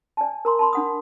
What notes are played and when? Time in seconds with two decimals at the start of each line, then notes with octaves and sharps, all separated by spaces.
0.17 D5 G#5 A5
0.45 A#4 A#5 C6
0.59 A5 B5 C6
0.73 D4 F#5 D#6